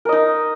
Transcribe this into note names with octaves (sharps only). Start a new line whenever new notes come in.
D#4 A#4 D#5